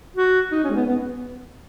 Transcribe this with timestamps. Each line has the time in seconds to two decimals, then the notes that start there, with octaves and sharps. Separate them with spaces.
0.16 F#4
0.52 D#4
0.64 C#4
0.70 G#3
0.75 B3
0.87 B3